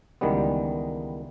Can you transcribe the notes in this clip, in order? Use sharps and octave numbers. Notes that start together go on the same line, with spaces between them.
C#2 D#3 E3 G3 B3